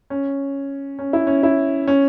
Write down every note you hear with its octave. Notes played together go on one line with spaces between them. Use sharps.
C#4
C#4
E4
C#4
E4
C#4